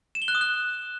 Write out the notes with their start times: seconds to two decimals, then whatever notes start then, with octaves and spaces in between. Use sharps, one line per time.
0.15 E7
0.22 G7
0.28 F#6
0.35 D#6
0.41 F#6